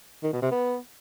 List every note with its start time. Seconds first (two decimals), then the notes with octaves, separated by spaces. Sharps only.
0.23 D#3
0.32 B2
0.42 C3
0.51 B3